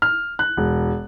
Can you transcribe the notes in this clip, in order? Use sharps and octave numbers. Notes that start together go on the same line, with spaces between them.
F6
F#6
E1